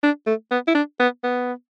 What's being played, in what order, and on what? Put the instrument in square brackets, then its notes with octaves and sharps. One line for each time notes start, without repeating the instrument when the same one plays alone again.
[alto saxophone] D4
A3
B3
E4
D4
B3
B3